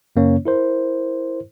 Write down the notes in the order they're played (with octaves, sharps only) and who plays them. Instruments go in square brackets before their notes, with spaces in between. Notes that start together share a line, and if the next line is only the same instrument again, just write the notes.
[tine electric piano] F#2 C#3 A#3 C#4 C#5
E4 A#4 C5